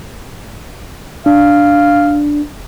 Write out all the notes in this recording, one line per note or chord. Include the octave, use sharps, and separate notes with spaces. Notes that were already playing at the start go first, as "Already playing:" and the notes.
D4 F5